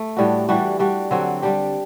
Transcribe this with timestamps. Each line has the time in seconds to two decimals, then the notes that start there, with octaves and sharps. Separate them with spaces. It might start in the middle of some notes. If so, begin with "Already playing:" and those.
Already playing: A3
0.17 A2 G3 D4 F#4
0.49 E3 G3 D4 F#4
0.79 G3 D4 F#4
1.11 D3 F#3 C4 F#4
1.42 G3 D4 G4